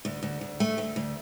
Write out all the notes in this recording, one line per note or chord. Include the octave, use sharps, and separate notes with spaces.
D2
D2
D2
A3
D2
D2